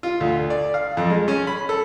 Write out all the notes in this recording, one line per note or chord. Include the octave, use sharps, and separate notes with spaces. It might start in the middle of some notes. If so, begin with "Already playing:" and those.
F4
D2
D5
F5
F2
G#3
C#4
B5
A4